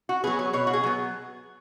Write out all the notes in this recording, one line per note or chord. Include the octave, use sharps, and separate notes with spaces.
F#4
F#3 B3 G#4
C#5
B2 C#5
F#4
G#4
F#3 B3